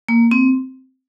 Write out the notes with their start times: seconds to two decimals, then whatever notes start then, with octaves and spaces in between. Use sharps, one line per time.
0.09 A#3
0.31 C4